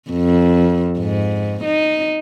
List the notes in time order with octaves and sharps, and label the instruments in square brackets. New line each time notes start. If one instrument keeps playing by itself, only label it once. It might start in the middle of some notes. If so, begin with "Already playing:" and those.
[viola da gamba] F2
G#2
D#4